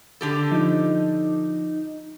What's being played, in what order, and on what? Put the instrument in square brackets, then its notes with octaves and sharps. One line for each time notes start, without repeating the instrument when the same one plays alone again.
[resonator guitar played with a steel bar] D3 G4 A4
[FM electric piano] F3 [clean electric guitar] D#4